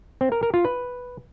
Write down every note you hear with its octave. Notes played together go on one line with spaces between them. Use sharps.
C4
A#4
A#4
F4
B4